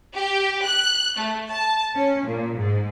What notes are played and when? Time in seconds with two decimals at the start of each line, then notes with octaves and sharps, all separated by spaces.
0.15 G4
0.64 F#6
1.18 A3
1.49 A5
1.96 C#4
2.27 A#2
2.58 G#2